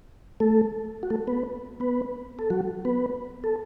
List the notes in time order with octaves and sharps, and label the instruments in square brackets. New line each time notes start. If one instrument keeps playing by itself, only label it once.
[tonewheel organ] A3 A4
F#4
A3 A4
B3 B4
B3 B4
A4
F#3 F#4
B3 B4
A4